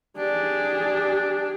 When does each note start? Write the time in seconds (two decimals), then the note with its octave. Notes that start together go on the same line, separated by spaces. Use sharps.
0.17 D4 G4 G#4